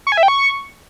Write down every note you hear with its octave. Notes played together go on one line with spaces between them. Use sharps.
C#6
G#5
E5
G5
C#6